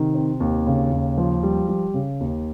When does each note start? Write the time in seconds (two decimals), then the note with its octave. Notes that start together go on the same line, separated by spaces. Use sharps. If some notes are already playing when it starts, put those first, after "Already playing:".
Already playing: C3 D#3
0.14 C4
0.40 D#2
0.67 C#3
0.92 D#2
1.18 F3
1.43 G3
1.69 G3
1.94 C#3
2.21 D#2